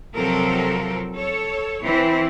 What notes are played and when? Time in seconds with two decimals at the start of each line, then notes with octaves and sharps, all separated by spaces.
0.15 C3 F3 F#3 C4 A4 A#4
1.14 A4 C#5
1.83 E3 C4 E4